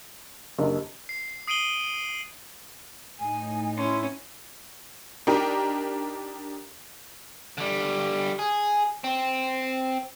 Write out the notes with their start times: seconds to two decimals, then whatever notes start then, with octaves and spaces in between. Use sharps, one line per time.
0.58 F#1 D4 G4 D#5
1.09 C7
1.47 D#6 C7 D7 D#7 F#7 G7
3.20 A2 D#4 G#5
3.77 C#4 E4 C6
5.27 D4 D#4 G4 A#4
7.58 D3 G3
8.39 G#4
9.04 C4